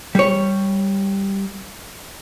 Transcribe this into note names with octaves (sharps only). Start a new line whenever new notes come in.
G3 C#5